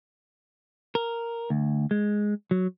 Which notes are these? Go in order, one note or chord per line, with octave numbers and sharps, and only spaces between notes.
A#4
D2
G#3
F#3